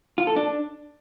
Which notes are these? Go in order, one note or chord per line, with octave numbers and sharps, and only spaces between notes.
F4
A4
D4